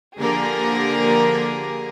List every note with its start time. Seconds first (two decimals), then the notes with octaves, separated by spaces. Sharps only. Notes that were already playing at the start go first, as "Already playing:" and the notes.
0.19 D3 F3 A#3 G4 G#4 A#4